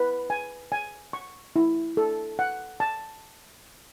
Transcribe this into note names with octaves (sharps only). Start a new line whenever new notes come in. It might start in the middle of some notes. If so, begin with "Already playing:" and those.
Already playing: B4
G#5
G#5
C#6
E4
A4
F#5
A5